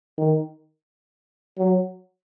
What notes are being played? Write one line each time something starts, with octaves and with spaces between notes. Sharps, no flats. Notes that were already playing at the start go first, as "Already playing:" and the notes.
D#3
F#3